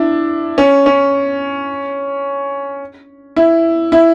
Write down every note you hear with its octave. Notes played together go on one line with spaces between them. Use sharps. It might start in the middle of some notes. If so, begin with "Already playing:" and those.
Already playing: D4 E4
C#4
C#4
E4
E4